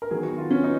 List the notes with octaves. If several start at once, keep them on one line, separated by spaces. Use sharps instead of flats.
A#4
D#3 F#3 B3 G#4
F#4
F4
C#4
B3 D#4